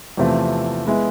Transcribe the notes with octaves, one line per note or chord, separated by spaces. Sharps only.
E2 C3 F3 A3 C4
G#3 B3 E4